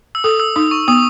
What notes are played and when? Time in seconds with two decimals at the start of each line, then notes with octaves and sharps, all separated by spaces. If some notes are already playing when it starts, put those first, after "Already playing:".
0.15 E6
0.24 A4 D#6
0.40 E6
0.56 D#4 D#6
0.71 C#6
0.88 B3 D#6